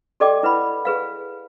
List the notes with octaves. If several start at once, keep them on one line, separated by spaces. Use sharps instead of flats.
G4 A4 D5 D#5 G5 D6
E4 B4 F#5 B5
G#4 B4 F5